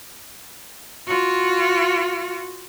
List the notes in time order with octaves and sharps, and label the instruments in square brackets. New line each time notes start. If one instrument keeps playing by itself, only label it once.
[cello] F4 F#4